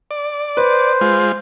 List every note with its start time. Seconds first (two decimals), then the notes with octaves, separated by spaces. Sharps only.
0.11 D5
0.57 B4 C5
1.01 G#3 F4